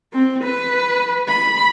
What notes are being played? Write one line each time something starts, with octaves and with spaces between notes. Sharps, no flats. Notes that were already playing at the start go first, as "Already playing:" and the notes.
C4
B4
B5